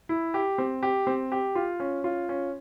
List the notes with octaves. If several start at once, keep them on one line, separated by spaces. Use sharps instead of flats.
E4
G4
C4
G4
C4
G4
F4
C#4
F4
C#4